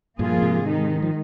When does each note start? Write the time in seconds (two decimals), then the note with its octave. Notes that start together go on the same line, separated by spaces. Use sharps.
0.19 G2 A#2 F3 A#3 F4 G#4
0.37 A#2
0.42 G#2 C3
0.64 D#3 G#3 D#4
1.02 F3